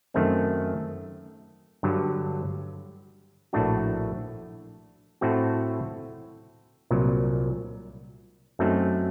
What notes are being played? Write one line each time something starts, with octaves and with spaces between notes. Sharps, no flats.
F#2 D#3 A3 C4
G2 D3 F#3
A#1 A2 A3 D4 F#4
A2 A3 C4 F#4
C2 A#2 F#3
F#2 F#3 A3 C4 D#4